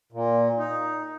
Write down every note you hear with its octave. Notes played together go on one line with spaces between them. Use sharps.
A#2
D#4